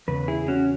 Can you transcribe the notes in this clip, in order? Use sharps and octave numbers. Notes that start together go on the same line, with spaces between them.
E2 C#3 B4
E4 G#4
C#4 F#4